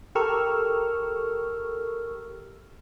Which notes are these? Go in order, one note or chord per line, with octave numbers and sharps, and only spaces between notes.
G4 A4 A#4 C#6 E6 F6